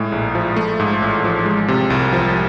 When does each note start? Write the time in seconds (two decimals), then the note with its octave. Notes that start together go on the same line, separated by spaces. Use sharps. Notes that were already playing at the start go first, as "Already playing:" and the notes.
Already playing: A2 G#3
0.12 A#1
0.35 F3
0.56 A3
0.80 G#2
1.02 A1
1.24 F3
1.46 G#3
1.68 C3
1.90 C2
2.13 F3